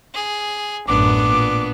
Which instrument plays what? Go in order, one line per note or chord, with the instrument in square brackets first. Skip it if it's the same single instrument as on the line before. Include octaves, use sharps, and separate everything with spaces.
[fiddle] G#4
[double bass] A1 F#2 [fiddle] B3 D4 [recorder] D6
[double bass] A#2